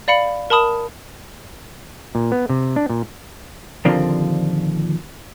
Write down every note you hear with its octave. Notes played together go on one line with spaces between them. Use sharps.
D5 F5 B5 C#7 F#7
A#4 A5 B5 D#6 E7
A#2
B3
C3
D4
A#2
D#2 A#2 D3 F3 C4